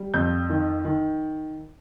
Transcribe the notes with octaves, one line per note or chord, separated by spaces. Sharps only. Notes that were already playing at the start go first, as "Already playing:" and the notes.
Already playing: G3
F2 G6
D#3
D#3